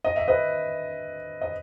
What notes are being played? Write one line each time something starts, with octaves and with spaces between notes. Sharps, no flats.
D#5
E5
B4 D#5
D#5